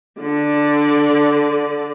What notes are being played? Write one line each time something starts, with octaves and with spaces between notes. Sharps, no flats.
D3 D5